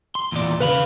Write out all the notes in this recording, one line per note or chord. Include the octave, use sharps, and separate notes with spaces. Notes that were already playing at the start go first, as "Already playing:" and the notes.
C6
E2 A#2 D5
C#3 B4 F5 B5